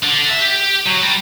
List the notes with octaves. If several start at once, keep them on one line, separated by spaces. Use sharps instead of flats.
D3
E5
G4
F#3
G3